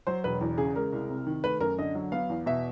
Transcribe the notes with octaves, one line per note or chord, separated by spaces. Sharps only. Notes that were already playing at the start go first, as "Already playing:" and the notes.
F#3 C5
E1 B4
E2
C#3 G#4
G#3 A#4
C2
C3
D#3
A3 B4
F#2 A#4
D3 D#5
F#3
B3 F5
E2
B2 E5